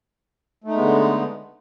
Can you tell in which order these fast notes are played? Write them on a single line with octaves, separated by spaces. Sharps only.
A3 D#4 G#3 B3 D3